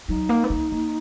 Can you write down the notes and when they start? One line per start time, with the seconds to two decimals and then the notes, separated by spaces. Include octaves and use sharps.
0.08 F#3 D#4
0.29 A#3
0.44 B3
0.50 A#3
0.72 A#3